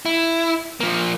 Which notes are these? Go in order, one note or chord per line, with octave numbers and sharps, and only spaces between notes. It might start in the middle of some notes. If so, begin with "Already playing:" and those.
E4
F3 A#3